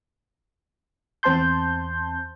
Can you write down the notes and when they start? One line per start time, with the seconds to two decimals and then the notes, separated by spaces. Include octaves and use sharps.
1.23 E2 C4 C5 A5 C6 G6